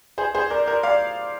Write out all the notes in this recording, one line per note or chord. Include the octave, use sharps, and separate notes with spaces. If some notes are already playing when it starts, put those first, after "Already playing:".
G#4 C5
G#4 C5
A#4 D5
A#4 D5
D5 F5